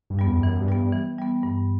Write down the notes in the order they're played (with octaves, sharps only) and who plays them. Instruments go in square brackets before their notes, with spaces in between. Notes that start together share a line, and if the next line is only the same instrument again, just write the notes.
[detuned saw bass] G2
[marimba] G3 B3
[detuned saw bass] E2
G2
[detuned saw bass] F#2 [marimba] E3
[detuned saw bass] G2
[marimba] G3 B3
[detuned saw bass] G2
[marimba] E3
G3 B3
G2